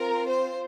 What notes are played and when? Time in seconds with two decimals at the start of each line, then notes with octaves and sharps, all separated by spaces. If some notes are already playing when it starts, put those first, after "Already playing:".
Already playing: C4 F4 A#4
0.27 C5